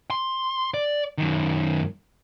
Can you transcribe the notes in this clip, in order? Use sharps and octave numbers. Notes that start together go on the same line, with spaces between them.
C6
D5
F#2 D#3